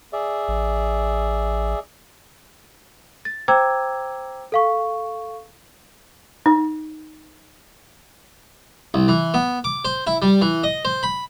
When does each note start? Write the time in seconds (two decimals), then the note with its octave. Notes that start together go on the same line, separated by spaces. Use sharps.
0.13 G#4 D5 E5
0.48 A1
3.25 A6
3.48 C5 G5 A#5 D6 E6 G#6
4.52 A4 F5 C#6
6.46 D#4
8.94 C2
9.08 E3
9.34 B3
9.64 D6
9.85 C5
10.07 E4
10.22 G3
10.42 E3
10.63 D#5
10.85 C5
11.03 B5